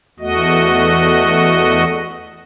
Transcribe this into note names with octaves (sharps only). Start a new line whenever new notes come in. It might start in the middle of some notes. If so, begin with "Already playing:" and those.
E2 A3 F#4 D#5